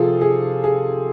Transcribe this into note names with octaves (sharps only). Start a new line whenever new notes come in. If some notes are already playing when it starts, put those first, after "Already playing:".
Already playing: C3 F3 F4 G#4 A4
G#4
G#4